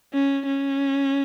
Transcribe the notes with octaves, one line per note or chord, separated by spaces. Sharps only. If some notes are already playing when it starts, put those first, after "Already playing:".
C#4
C#4